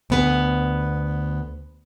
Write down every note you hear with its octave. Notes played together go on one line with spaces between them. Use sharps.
D2 B3 B4